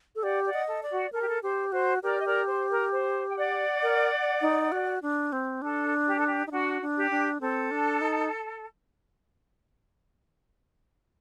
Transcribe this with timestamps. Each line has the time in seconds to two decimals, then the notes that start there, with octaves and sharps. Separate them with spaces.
0.16 A4
0.22 G4 D5 F#5
0.45 D5 F#5
0.54 D#5
0.68 A4
0.83 D5
0.90 F#4
1.12 A4 A#4
1.21 G4
1.29 A4
1.43 G4 C5
1.72 F#4 C5
2.03 G4 A#4 D5
2.19 D#5
2.25 A#4 D5
2.48 C5
2.70 A#4
2.92 C5
3.29 G5
3.37 D5 F#5
3.83 A#4
4.41 D#4
4.72 F#4
5.02 D4
5.32 C4
5.62 D4 A4
6.06 G4
6.17 A4
6.27 G4
6.47 D#4
6.51 D4 F#4
6.82 D4
6.97 G4
7.11 D4
7.41 C4 A4
7.71 D4
8.01 D#4